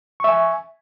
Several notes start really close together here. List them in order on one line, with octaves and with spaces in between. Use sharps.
C#6 E5 G#5